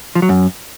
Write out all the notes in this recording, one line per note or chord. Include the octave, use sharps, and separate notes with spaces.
F3
F#3
F#2